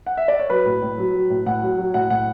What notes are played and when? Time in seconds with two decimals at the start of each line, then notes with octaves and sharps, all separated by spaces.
0.06 F#5
0.17 E5
0.28 D5
0.39 C#5
0.50 F#3 B4
0.66 A2
0.82 A2
0.98 F#3
1.14 F#3
1.30 A2
1.46 A2 F#5
1.62 F#3
1.78 F#3
1.94 A2 F#5
2.10 A2 F#5